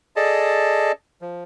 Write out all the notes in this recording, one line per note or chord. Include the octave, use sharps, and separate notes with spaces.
G#4 A4 D5 D#5 A5
F3